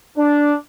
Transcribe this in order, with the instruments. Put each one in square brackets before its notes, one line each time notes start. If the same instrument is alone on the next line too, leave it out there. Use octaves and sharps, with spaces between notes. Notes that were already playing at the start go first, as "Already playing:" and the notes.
[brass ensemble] D4